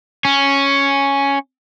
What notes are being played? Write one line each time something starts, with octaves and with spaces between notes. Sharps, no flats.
C#4